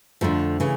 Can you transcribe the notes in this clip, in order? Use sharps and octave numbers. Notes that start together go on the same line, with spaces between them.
F2 D3 F3 A3
C#3 E3